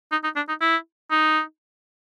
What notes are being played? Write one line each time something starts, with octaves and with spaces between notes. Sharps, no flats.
D#4
D#4
D4
D#4
E4
D#4